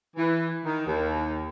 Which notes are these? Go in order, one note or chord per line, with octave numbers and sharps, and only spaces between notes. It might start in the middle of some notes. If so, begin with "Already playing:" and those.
E3
D#3
D#2